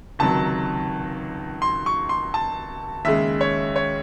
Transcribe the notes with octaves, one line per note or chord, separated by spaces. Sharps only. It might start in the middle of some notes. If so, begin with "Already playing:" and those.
C#2 C3 D#3 F#3 A5
C6
C#6
C6
A5
D#2 C#3 G#3 E5
C#5
C#5